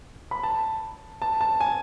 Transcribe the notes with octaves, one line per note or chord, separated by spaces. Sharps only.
B5
A5
A5
A5
G#5